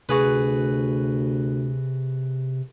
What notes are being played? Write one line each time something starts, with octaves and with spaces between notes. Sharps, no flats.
D2 C3 F#4 G#4 B4